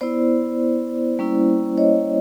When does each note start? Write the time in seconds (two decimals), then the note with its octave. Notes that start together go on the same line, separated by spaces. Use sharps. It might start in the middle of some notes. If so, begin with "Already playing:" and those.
0.01 B3 E4 C5 D5
1.19 G3 A#3 C#4 E4
1.78 C#5 D#5